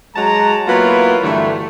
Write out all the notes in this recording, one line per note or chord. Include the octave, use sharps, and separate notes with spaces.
F#3 G#3 A5 A#5
F#3 A#3 B3 E4 F4
G2 D3 E3 A3